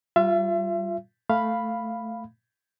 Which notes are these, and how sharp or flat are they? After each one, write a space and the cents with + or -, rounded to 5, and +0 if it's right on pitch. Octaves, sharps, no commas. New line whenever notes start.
G3 -20 F4 +0 E5 +35
A3 +0 F5 +0 B5 +0